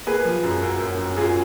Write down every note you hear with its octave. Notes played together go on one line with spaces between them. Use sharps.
A#3 G#4 B4
F3
F#2
F#2
F#2
F#2
F#2 F4 G#4